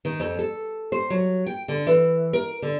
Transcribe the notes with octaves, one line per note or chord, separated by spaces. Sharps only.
D#3
F2
A4
C5
F#3
G5
D3
E3
A#4
D3